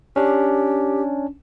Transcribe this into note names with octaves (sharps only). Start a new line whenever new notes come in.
C#4 D4 G4